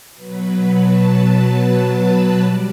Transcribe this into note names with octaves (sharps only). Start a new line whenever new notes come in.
B2 F#3 B4
A5
B5
B5
G3 D5